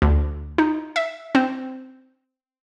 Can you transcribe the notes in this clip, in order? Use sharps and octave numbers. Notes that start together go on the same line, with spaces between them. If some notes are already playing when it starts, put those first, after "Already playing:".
D2
D#4
E5
C4